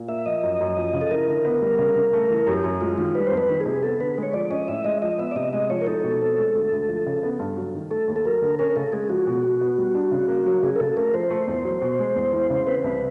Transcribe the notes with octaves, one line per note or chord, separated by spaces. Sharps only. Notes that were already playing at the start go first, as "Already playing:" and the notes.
Already playing: A#2
A#3 E5
F3 D#5
F#2
F#2
F3
C#3
A4
E4 A#4
D3
B3
G3
C#3
C#3
A3
E3
F#2 G4
F#2
G#3 F4
D#3 F4
G3 B4
C5
F2
B4
D#3
G#4
C3
B3 A4
D3 B4
G#3
C#5
F3 D5
C#4 D#5
A2 E5
G#3 D#5
F3 D#5
B3 E5
D5
C3 D#5
G#3 D#5
F3 C#5
A#4
D#4 A4
B2
C4
G#3
D2
D2
F3
C#3
B3
G2
F#3
D#3
A3 A4
D#2
A4
F#3 A#4
D3
C#4 A#4
C#3 A4
G#3 G#4
F3 F#4
B2
B2
B3
G3
D4
C#3
A#3
F#3
C#3 G#4
A#4
C#3 A4
A3 A#4
F3 C5
A3
E2
F#3
B2
G#3
E2
E3
C#3
C4 B4
C2